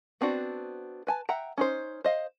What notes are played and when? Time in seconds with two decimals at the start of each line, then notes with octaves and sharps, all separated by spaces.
0.21 B3 C4 D4 F#4
1.07 B4 G#5 A5
1.29 E5 F#5 G5 A#5
1.58 C#4 D#4 C5
2.04 C5 D#5 F5